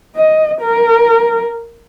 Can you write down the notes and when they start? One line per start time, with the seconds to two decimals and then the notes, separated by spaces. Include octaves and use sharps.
0.16 D#5
0.61 A#4